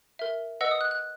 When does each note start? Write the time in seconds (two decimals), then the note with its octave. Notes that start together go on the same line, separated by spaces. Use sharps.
0.19 A#4 E5
0.61 B4 D#5 F#5 E6
0.71 D#6
0.81 F#6
0.91 F#6